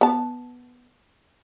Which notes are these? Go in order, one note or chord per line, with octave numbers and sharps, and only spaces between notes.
B3 A5